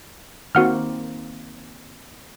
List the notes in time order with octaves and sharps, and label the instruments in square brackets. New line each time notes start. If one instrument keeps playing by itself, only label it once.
[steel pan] D#3 A#3 C4 [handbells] F#4 F#5 F6